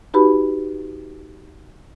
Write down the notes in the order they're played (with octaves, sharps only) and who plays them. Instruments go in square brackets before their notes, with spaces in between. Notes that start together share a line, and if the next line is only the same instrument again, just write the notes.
[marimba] D#4 F#4 G4 B4 A5 B5